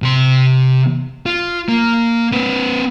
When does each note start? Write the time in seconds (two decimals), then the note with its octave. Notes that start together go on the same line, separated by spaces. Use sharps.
0.02 C3 C6
1.26 F4
1.69 A#3
2.32 C4 B4